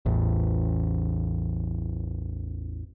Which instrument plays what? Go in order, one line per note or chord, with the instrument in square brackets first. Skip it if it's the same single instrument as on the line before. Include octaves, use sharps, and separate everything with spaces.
[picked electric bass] A1 E2